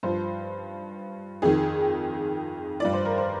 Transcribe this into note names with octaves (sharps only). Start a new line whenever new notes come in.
G2 F3 C5
F2 D#3 G#4
G2 F3 D5
C5
A#4
C5